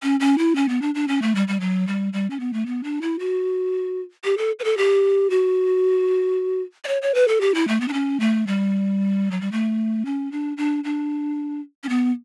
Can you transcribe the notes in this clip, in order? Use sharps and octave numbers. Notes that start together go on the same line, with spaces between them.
C#4
C#4
E4
C#4
B3
D4
D4
C#4
A3
G3
G3
F#3
G3
G3
C#4
B3
A3
B3
D4
E4
F#4
G4
A4
B4
A4
G4
F#4
D5
C#5
C#5
B4
A4
G4
E4
A3
B3
D4
C#4
A3
G3
F#3
G3
A3
C#4
D4
D4
D4
C#4
B3